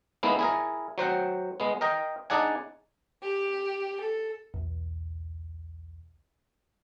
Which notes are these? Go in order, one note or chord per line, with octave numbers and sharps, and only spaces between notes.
G#3 A#3 B3 D#4 E4
E4 G#4 A#4
F#3 C5 F#5 G5
G#3 B3
A#4 D#5 G5
D4 D#4 G#4 D5 F#5 G#5
G4
A4
B1 E2